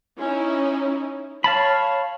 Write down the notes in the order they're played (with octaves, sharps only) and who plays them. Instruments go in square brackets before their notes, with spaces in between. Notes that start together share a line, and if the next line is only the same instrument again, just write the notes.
[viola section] C#4 D#4 E4
[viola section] C#5 [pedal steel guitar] F5 A5 B5